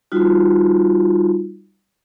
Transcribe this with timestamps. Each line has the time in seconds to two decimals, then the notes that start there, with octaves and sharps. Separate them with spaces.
0.12 G3 D#4 F4 F#4